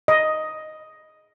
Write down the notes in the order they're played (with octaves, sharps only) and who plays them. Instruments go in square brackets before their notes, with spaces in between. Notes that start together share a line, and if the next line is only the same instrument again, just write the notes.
[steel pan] D#5